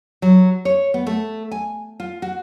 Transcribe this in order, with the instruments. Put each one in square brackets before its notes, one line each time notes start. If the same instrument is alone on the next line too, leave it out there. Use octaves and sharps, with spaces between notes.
[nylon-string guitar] F#3
C#5
B3
A3
G#5
F4
F#4